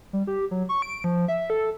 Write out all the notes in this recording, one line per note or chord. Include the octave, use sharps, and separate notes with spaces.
G3
G4
F#3
C#6
D7
F3
E5
A4